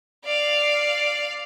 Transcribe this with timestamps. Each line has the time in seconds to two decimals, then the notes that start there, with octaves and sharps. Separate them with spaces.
0.25 D5 F5